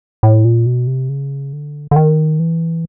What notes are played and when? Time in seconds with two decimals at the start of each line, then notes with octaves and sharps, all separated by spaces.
0.23 A2
0.45 A#2
0.66 B2
0.87 C3
1.09 C#3
1.53 D3
1.91 D3
1.96 D#3
2.40 E3